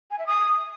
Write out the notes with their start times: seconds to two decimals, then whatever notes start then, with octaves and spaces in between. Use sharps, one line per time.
0.10 G#5
0.18 E5
0.26 D#6